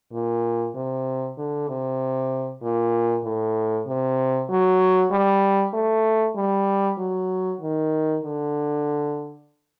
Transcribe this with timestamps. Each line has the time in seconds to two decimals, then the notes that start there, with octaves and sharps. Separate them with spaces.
0.13 A#2
0.75 C3
1.37 D3
1.69 C3
2.62 A#2
3.24 A2
3.87 C3
4.49 F#3
5.12 G3
5.74 A3
6.36 G3
6.98 F#3
7.61 D#3
8.23 D3